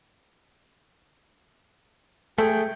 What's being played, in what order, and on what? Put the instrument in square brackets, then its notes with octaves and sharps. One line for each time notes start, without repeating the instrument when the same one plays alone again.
[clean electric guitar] A3 [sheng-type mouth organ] G#4 G5 [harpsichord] A4